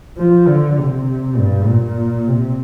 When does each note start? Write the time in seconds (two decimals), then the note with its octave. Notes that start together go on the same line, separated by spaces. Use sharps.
0.18 F3
0.47 D3
0.78 C3
1.38 G2
1.67 A#2
2.28 C3